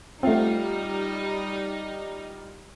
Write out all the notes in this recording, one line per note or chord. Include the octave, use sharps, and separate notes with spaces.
G3 A3 C4 D#4 F4 F5 F#5